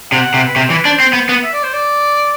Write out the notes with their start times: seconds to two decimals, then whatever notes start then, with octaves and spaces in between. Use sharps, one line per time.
0.11 C3 F#5
0.34 C3
0.47 B4
0.55 C3 C5
0.70 E3 B4
0.84 D4 C5
1.00 C4
1.13 B3
1.29 B3
1.43 E5
1.53 D5
1.63 C5
1.73 D5